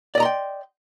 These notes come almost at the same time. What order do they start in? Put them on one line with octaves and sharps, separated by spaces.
D5 D#5 A#5 C6 G5